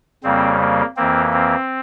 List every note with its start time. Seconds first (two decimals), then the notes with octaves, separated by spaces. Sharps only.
0.23 F2 C#3 G3 A#3 C4
0.60 A#3
0.96 F2 E3 A#3 C4
1.33 C4